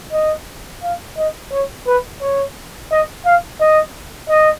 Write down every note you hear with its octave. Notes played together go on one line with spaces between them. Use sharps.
D#5
F5
D#5
C#5
B4
C#5
D#5
F5
D#5
D#5